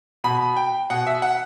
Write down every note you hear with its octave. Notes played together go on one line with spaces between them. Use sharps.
B2 B5
G5
B2 F#5
E5
F#5